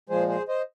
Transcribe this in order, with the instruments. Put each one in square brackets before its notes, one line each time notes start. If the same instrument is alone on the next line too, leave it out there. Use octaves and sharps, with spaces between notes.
[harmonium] A#2 F3 G#3 G#4 C5
G#4 C5
C5 D#5